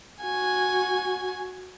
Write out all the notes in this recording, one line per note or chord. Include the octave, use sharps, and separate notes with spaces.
F#4 G#5